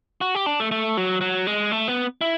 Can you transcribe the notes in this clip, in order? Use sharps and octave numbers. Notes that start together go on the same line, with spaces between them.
F#4
G4
D4
A3
A3
F#3
F#3
G#3
A3
B3
E4